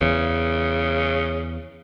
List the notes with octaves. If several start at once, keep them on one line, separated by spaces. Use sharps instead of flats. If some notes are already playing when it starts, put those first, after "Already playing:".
E2 C#3